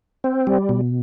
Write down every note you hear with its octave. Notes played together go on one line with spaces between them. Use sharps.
C4
G3
B2